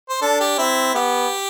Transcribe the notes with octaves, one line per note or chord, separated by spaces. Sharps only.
C5
D4 A4
G4
C4 E4
B3 G4